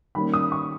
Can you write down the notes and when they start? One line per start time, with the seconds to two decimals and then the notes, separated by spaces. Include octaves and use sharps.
0.15 D#3 G3 A#3 C#4 B5
0.34 D#6
0.52 C#6